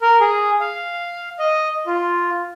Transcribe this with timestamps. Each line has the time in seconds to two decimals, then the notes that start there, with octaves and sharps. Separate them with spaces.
0.01 A#4
0.20 G#4
0.60 F5
1.39 D#5
1.86 F4